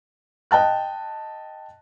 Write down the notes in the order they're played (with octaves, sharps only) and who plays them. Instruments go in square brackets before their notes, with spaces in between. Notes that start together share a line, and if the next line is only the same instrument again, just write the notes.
[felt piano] D#5 G5 A5 F#6